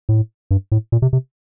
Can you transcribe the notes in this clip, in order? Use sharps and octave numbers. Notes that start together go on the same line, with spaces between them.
A2
G2
A2
A#2
C3
C3